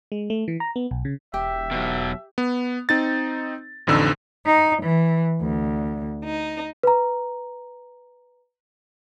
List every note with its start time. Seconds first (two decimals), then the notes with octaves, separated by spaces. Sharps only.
0.12 G#3
0.30 A3
0.48 E3
0.60 A#5
0.76 B3
0.91 B1
1.05 C#3
1.34 E1 G4 E5
1.71 B2 F#3
2.38 B3
2.89 C4 D#4 A6
3.87 A1 F2 D3 D#4 E6
4.45 D#4
4.82 E3
5.42 D2
6.24 D#4
6.83 B4 A#5